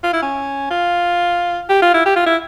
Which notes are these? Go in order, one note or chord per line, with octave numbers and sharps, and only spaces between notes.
F4
E4
C#4
F4
G4
F4
E4
G4
F4
E4